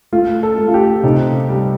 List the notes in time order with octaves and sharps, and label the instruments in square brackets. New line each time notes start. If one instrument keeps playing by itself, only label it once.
[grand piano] A3 [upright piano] F4
[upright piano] A4
[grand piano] A3
[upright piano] F4
G4
[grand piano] C3 [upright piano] D#4
[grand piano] G3